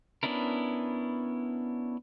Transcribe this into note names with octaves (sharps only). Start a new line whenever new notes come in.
B3 C#4 D4 E4 A#4